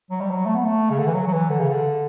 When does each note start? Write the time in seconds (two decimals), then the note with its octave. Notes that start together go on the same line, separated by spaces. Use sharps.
0.10 F#3
0.21 G3
0.30 F#3
0.45 A3
0.54 B3
0.64 A3
0.90 C#3
0.99 D3
1.07 E3
1.14 F#3
1.27 F#3
1.33 E3
1.50 D3
1.60 C#3
1.69 D3